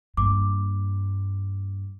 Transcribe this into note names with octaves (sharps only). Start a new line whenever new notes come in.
G2 A#3 D6